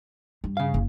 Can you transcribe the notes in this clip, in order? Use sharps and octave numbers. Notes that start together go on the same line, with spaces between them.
G2
C#3 F5
F#1